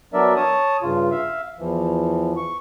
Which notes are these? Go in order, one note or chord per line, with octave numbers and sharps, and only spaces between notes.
F#3 B3 D4 A#4 D5 E5
C#5 A5 D#6
G2 C#3 F4
E5 F5
E2 E3 F3
C#6